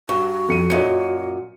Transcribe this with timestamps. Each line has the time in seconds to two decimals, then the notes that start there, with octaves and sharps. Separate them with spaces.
0.09 G2 F#4 C#6
0.48 F2 C#7 D#7
0.70 F#2 A#2 C#5 D#5 C#7